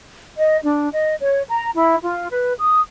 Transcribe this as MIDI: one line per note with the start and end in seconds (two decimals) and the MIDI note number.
0.37 0.57 75
0.63 0.88 62
0.93 1.14 75
1.21 1.42 73
1.50 1.68 82
1.75 1.96 64
2.03 2.27 65
2.30 2.52 71
2.60 2.81 87